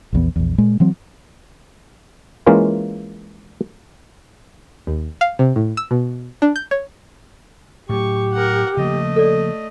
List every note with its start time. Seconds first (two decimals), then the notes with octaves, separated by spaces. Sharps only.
0.13 A#1 E2 B3
0.36 A#1 E2
0.58 A#2 G#3 A#3
0.80 E3 F#3 C4
2.46 E3 G#3 A#3 C#4 F4 A#4
4.87 D#2
5.21 F5
5.39 C3
5.56 A2
5.77 E6
5.91 B2
6.42 D4
6.56 G6
6.71 C#5
7.89 A2 F#3 G4 C#6
8.33 A#4 F#5
8.77 C#3 F3 A3 A#3 D#5
9.16 A4 D5